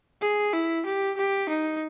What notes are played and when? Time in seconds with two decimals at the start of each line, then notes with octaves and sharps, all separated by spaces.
0.22 G#4
0.53 E4
0.86 G4
1.17 G4
1.50 D#4